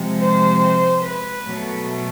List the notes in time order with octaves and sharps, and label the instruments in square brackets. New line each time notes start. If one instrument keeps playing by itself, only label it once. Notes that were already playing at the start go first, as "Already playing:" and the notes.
Already playing: [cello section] C3 F3 G#3
C5
B4
B2 F#3 A3